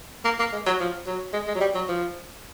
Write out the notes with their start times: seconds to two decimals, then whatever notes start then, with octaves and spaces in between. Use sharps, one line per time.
0.25 A#3
0.40 A#3
0.53 G#3
0.67 F#3
0.80 F3
1.07 F#3
1.33 G#3
1.48 G#3
1.55 F#3
1.61 G3
1.75 F#3
1.89 F3